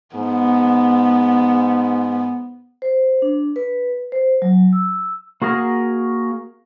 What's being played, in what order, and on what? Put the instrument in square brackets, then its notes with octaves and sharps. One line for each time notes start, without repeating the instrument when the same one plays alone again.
[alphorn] G#2 [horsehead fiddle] B3
[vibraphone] C5
D4
B4
C5
F#3
E6
[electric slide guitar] A#3 F#4 G#4 A#4